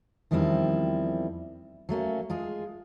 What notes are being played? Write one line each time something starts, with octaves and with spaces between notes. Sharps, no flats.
E2 D#3 F3 G3 C4 E4
F#3 A3 A#3 C#4
G#3 F4 G#4